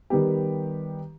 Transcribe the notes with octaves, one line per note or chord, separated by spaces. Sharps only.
D#3 G3 B3 G4